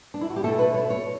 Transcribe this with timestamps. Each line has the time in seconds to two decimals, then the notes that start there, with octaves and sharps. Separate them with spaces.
0.14 D4
0.21 E4
0.30 F#4
0.36 G4
0.43 B2 A3 D4 A4
0.59 B4
0.74 C#5
0.90 C#5